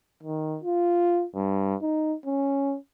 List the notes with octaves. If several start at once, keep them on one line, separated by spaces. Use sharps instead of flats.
D#3
F4
G2
D#4
C#4